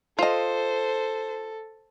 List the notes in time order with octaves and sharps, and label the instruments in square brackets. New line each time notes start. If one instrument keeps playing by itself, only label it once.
[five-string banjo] F4 D#5 [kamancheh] A4 [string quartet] C5